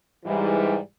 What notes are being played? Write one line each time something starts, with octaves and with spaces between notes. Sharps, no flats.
G#2 E3 G3